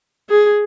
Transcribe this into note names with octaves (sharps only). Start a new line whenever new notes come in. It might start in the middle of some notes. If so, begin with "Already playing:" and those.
G#4